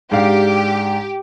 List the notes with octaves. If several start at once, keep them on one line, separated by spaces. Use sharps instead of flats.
G#2 D4 G4 F5